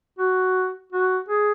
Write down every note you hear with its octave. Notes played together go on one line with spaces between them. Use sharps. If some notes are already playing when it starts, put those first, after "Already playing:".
F#4
F#4
G#4